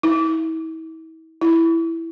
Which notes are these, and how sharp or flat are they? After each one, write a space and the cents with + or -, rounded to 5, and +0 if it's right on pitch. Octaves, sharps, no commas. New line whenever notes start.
E4 -40
E4 +0